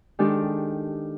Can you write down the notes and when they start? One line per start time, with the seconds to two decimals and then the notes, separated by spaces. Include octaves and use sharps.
0.19 D#3 G#3 D4 G4 A4 D5